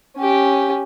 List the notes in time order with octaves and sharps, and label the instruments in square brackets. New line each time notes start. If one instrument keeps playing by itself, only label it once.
[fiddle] C#4 G4